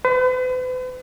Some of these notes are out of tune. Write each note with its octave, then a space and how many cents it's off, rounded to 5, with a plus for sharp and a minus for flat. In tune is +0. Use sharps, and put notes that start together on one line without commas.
B4 +45